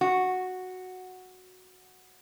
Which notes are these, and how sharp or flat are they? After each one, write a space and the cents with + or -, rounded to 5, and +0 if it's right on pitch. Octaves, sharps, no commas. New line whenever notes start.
F#4 -5